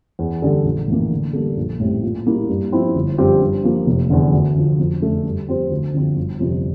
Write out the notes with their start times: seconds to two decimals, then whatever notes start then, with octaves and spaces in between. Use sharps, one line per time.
0.19 E2
0.42 D3 G3 D4 A4
0.65 A#1
0.88 A2 E3 A#3
1.11 D3
1.33 G3 A#3 D4 A4
1.57 A#1
1.80 A2 G3 C4
2.03 A#2
2.26 G3 A#3 E4
2.49 G2
2.72 F3 C4 E4
2.95 G1
3.18 G2 F3 C4 G4
3.41 G2
3.64 F3 A#3
3.87 F1
4.10 E2 D3
4.33 D2
4.56 D3 F3
4.79 F2
5.02 D3 A3
5.25 G2
5.48 F3 C4 G4 C5
5.71 D2
5.94 D3 F3 C4 F4
6.17 G1
6.40 F2 C3 G3